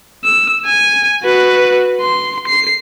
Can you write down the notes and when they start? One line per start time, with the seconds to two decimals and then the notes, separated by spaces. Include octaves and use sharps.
0.25 E6
0.65 G#5
1.24 F#4 B4
2.01 C6
2.47 C7